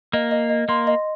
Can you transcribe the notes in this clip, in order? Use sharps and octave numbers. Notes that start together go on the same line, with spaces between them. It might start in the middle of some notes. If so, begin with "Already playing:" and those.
A#3 D#5
D#5
D#5
A#3 C6
D#5